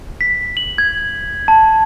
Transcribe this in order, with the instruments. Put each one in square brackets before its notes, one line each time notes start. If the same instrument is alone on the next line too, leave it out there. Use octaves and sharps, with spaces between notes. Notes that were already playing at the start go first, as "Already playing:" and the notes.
[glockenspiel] B6
F#7
G#6
A5